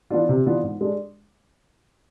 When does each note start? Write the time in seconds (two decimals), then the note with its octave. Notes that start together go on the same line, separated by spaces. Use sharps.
0.10 E3 B3 D4 F4
0.29 C3
0.46 E3 B3 D4 F4
0.63 G#2
0.81 G#3 D4